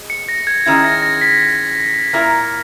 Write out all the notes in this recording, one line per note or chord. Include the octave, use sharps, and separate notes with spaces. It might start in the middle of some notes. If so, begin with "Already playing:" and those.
Already playing: G#3
C#7
A#6
G#6
D#3 G#3 C#4 E4 G#6
A#6
A#6
B6
A#2 A#3 E4 A#4